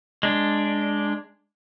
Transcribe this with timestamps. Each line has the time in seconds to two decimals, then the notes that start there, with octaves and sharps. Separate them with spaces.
0.23 G#3 D4